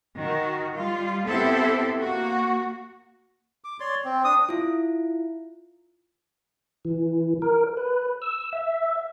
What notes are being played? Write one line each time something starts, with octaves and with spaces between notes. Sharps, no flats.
D#3 F#4
G3 F4
B3 C4 E4 G4 A4 C5
A#3 F#4
D6
C#5 D5 C6
C4
D4 D#6
E4 F4
E3
A#4
B4
E6
E5